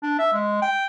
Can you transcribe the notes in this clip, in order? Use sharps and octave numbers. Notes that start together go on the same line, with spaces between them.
D4
E5
G#3
G5